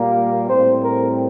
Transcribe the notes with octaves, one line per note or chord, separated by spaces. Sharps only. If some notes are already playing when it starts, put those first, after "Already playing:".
Already playing: A#2 G3 A#3
A2 G3 C4 C5
A#4